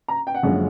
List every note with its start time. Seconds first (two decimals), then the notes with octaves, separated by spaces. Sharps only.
0.08 A#5
0.27 G5
0.35 F#5
0.43 F#1 F#2 D3 F3 G#3